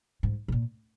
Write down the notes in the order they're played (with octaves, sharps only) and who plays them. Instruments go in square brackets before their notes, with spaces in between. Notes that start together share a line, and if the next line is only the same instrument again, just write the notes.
[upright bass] G#2
C3
A#2